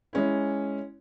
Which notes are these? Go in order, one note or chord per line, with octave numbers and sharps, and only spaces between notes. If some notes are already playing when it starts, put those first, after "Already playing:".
G#3 C#4 E4